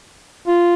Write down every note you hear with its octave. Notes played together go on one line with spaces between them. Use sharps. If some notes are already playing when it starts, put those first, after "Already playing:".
F4